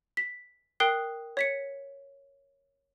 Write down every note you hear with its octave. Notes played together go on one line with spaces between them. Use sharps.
B6
A#4 G5 D#6 F#6 C7 G7
C#5 B6 C#7